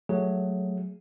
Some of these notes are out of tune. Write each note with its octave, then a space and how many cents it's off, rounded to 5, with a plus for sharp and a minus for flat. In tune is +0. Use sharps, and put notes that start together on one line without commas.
F#3 +0 A3 +0 G#4 +0